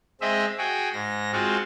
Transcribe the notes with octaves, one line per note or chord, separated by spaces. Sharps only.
G#3 C4 D#5 E5
F#4 G#4 G5
G#2 A#6
G#3 C4 F4 F#4